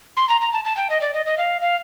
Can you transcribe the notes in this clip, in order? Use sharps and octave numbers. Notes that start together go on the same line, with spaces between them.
C6
A#5
A#5
A5
A5
G5
D#5
D5
D#5
D#5
F5
F5